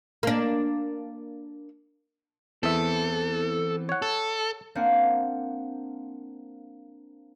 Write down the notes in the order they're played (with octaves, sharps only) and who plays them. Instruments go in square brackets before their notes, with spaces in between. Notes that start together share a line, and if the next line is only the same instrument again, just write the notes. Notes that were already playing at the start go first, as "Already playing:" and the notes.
[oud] A#3 D4
[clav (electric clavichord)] E2 E5 [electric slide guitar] E3 B3 C4 [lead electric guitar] A4
[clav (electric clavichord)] C#5 F#5
[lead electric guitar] A4
[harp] A#3 C4 D4 F5 F#5